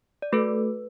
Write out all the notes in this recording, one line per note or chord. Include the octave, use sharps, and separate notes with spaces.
D5
A3 F#4 A4 B4